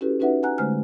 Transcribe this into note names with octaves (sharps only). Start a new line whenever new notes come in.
C#4 E4 F#4 G4 A4 B4
C#4 D#4 F#4 B4 E5 F#5
F#5 G#5 A#5 F#6
D3 G#3 A3 C5 G#5 F6